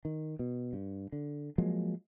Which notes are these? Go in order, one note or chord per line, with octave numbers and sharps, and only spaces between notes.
D#3
B2
G2
D3
F3 F#3 G#3 A#3